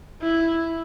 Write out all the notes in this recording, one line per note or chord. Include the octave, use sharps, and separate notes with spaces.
E4